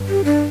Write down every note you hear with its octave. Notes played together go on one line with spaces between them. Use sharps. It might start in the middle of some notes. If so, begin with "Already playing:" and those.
Already playing: G2
G4
D4